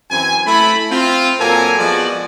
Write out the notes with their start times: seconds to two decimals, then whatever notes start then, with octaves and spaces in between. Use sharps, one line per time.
0.10 F#2 E3 C4 G#5
0.46 A3 E4 B5
0.91 C4 F4
1.40 A#2 F#3 A4 A#4 F5 G#5
1.78 F3 G#3 B3 F#4 D5